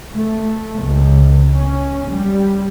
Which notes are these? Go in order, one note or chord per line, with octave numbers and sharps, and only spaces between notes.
A3
C#2
C#4
G3